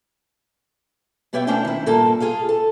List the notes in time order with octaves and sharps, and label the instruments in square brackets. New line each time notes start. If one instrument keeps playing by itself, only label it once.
[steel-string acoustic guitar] B2 B3 G4 C#5 E5 G5
A3 C#4 D4 E4 C5 G5
D#3 E4
G2 A#2 A#3 A4 A#4 A5
F4 G#4 A4 F5
A4